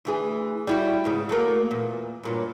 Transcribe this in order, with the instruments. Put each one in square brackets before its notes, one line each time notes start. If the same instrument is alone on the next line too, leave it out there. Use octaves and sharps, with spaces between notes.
[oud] D2 E3 G#4
G3 E4 F#4
E2 G#2 C#3
F#3 A3 A#3
E2 A#2
G2 A#2 F#3